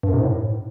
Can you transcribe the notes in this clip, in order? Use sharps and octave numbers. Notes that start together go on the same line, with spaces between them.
G2
F#2
C3
G#2
A2